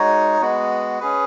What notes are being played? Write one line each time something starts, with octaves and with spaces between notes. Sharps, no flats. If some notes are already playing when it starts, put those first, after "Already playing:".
Already playing: G#3 D#4 F#4 C#5
G#3 B3 F#4
C#4 G#4 B4